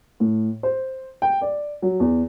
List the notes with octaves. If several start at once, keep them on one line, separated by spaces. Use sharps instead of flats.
A2
C5
G5
D5
F#3
E2